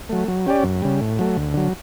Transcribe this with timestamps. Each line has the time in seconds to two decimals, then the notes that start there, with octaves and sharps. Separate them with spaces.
0.09 F#3 A3
0.28 F#3
0.46 C#4 G4 D5
0.64 F#2
0.82 C#3 G3
1.01 A2
1.19 F#3 A3
1.37 D2
1.54 D3 F#3